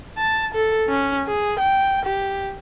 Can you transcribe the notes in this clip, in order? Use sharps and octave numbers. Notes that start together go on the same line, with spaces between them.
A5
A4
C#4
G#4
G5
G4